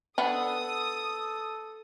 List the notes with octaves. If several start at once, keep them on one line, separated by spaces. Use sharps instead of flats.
B3 D4 A4 D#6